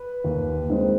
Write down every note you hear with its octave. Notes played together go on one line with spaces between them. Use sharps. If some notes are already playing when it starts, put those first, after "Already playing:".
Already playing: B4
D#2
D#3 G#3 C4